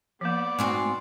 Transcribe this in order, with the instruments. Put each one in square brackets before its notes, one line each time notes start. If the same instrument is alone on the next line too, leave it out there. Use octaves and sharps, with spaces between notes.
[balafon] F3 A#3 [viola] B3 D5
[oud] G#2 C4 F#4